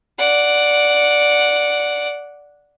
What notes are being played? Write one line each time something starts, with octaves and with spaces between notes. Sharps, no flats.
D5 F#5